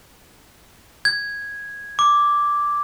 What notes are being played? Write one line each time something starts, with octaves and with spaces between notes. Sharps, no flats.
G#6
D6